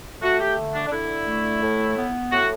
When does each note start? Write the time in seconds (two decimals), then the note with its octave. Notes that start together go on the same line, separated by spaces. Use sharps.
0.22 A3 F#4
0.40 G4
0.58 D3
0.74 D4
0.87 D4
0.91 D3 E4
1.27 A3
1.62 A2
1.96 B3
2.31 A2 F#4